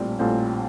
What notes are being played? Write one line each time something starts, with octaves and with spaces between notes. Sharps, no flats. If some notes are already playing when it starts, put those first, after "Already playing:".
Already playing: A#1 A2 G3 C4
A#1 A2 G3 C4